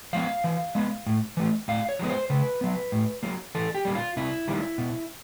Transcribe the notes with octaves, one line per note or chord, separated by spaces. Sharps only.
F3 G#3 B3 F5
E3
G#3 B3
A2
E3 A3
A2 F5
C#5
F3 G#3 B3
C5
C#3 B4
F#3 B3
A2
F#3 A#3
E3 A4
G4
G3 A#3
F4
C3 E4
D#3 G3 A#3
B2